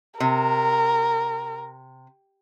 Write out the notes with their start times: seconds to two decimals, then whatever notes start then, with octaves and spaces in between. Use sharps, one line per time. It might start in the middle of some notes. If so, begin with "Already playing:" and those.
0.20 C3 A#4